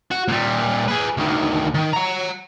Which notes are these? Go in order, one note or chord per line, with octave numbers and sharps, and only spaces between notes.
F#4
A#2 G3
G#4 B4
D2 D#3
D#3
F#5 A#5